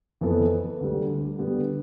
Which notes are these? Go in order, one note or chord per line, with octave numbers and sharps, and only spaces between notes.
F2 E3 B3 E4 A4
D2 D3 G3
D3 G3 B3